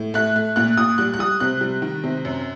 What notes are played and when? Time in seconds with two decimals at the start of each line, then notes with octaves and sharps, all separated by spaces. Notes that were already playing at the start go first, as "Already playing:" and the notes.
Already playing: A2
0.14 A3 F#6
0.36 A3
0.56 A#2 F#6
0.77 A#2 D#6
0.98 G3 F#6
1.14 F#6
1.19 G3 D#6
1.40 C3 F#6
1.61 G3
1.82 D#3
2.04 C3
2.25 F#2